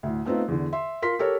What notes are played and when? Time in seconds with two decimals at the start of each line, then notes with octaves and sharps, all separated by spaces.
0.03 D2 A2
0.25 A3 B3 C4 D#4 F4
0.48 E2 D3
0.73 E5 C6
1.02 F4 A#4 C6 B6
1.19 G4 A4 A#4 C#5